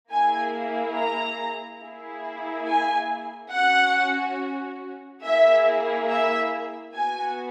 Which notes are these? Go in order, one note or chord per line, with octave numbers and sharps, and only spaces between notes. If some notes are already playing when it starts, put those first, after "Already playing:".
A#3 E4 G#4 G#5
A#5
A#3 E4 G#4
G#5
C#4 F#4 F#5
A#3 E4 G#4 E5
E5
B3 F#4 G#5